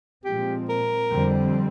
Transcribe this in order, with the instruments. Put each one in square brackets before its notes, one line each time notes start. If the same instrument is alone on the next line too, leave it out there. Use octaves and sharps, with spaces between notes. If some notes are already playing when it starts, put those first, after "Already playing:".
[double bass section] A#2 F3 G#3 C4 [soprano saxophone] G4
[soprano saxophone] A#4
[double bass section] F2 D3 G3 C4